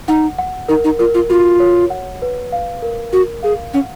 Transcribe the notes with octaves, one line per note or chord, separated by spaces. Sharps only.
D#4 F#5
F#5
D#4 A#4
D#4
F4 A#4
F4
F4 F#4
C#5
F#5
B4
F5
A#4
F#4 A#4
G#4 F5
C#4 F#5